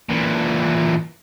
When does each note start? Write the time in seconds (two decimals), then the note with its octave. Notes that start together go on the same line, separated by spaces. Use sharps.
0.09 A#2 E3